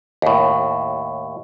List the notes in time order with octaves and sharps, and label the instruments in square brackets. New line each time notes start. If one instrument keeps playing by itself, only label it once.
[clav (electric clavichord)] D#2 A2